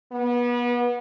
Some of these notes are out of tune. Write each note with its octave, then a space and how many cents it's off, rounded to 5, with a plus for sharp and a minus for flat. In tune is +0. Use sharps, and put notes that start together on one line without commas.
B3 -30